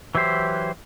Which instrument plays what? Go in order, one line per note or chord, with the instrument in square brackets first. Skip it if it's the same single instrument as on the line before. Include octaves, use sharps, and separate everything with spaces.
[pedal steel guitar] E3 F#3 E4 G4 C5